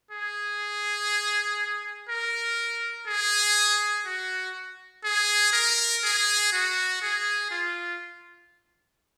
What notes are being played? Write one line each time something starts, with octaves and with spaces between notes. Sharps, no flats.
G#4
A#4
G#4
F#4
G#4
A#4
G#4
F#4
G#4
F4